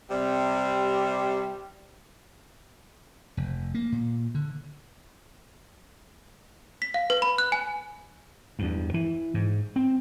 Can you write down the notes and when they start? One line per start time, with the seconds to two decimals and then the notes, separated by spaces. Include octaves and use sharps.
0.10 C3 G3
3.37 F1
3.75 A#3
3.92 A#2
4.35 D3
6.82 B6
6.94 F5
7.10 B4
7.22 B5
7.38 F#6
7.52 G#5
8.59 E2 G2
8.94 E3
9.34 G#2
9.76 C4